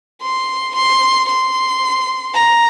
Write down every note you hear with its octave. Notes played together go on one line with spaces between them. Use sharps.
C6
C6
C6
A#5